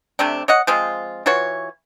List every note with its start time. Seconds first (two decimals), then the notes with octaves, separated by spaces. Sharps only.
0.19 C3 A3 C4 D4
0.48 C#5 D#5 F#5
0.67 F3 G#3 C4 F4
1.26 E3 F4 F#4 C#5